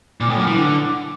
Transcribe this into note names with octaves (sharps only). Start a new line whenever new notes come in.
A#2
A2
F#2
E3
D3